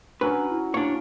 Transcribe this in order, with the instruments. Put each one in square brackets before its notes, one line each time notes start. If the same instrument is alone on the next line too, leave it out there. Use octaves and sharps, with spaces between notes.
[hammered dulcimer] F#3 C#4 [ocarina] D4 [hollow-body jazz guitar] B4
[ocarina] E4
[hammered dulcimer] A#3 [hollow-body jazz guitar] D4 C#5